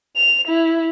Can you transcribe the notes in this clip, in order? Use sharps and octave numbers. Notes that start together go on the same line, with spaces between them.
F7
E4